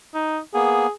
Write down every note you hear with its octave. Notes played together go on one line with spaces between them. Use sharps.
D#4
A#3 B3 G#4